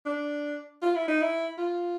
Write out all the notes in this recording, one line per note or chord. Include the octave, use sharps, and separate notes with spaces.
D4
F4
E4
D#4
E4
F4